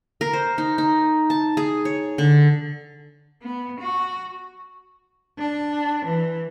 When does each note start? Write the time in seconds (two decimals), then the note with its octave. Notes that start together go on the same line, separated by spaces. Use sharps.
0.21 A#4
0.33 C5
0.58 D#4
0.78 D#4
1.30 A5
1.57 G#4
1.85 C#5
2.18 D3
3.42 B3
3.80 F#4
5.38 D4
6.06 E3